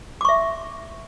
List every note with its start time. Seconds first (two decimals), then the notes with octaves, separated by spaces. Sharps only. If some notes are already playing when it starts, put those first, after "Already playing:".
0.21 D6
0.25 C#6
0.29 E5